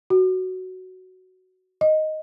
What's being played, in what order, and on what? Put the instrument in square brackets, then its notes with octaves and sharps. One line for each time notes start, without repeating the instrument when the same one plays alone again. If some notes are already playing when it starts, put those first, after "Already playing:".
[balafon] F#4
D#5